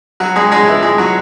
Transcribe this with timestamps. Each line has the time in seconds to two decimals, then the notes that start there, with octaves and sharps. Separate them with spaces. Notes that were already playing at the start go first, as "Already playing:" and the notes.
0.20 F#3 F#4
0.36 G#3 G#4
0.52 G#3 G#4
0.67 E3 E4
0.82 G#3 G#4
0.98 F#3 F#4